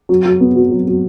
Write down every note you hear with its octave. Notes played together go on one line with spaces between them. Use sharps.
F#3
F#3
B3
F#4
F#3
F#3